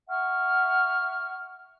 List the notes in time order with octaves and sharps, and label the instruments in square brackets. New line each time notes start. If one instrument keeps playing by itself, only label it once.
[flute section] E5 F#5 C#6 F6